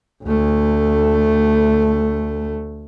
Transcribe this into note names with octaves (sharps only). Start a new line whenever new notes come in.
D2 A3